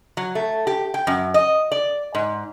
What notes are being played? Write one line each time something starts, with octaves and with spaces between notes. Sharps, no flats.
F#3
A3
G4
G5
F#2
D#5
D5
G#2